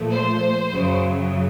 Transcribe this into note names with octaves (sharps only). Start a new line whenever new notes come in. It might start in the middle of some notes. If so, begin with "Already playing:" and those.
Already playing: A#2 F3 A3
C5
F#2 C#3 F#3